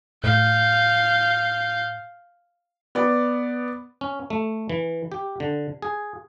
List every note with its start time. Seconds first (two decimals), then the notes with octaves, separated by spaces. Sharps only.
0.24 A2 F5 G6
2.95 B3 D5
4.01 C#4
4.30 A3
4.70 E3
5.12 G4
5.40 D3
5.82 G#4